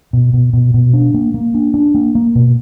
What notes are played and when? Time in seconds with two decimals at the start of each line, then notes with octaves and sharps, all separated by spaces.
0.13 B2
0.34 B2
0.53 B2
0.74 B2
0.94 D4
1.14 A#3
1.34 A#3
1.54 D4
1.74 D4
1.94 A#3
2.15 A#3
2.35 B2